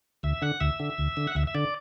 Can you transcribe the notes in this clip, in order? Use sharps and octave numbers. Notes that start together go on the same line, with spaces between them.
D2 E5
D3 F#5
D2 E5
D3
D2
D3
F#5
D2 E5
E5
D3 D5